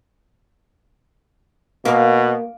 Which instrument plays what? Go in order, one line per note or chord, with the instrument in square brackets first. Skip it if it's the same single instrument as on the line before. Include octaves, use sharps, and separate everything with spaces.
[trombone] B2 [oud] A#3